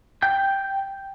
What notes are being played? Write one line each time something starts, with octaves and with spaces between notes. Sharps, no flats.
G5 G6